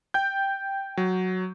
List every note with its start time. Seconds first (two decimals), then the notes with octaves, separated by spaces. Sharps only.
0.14 G5 G6
0.97 F#3